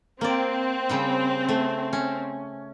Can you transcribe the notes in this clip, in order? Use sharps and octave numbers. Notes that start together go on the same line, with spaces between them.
A#3 C4 D5
C#3 G3 G5
A3
C#4